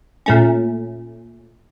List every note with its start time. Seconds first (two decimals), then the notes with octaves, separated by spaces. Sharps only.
0.26 A#2 A3 C#4